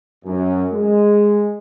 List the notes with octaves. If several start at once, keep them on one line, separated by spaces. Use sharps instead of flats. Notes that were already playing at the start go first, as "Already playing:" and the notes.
F#2
G#3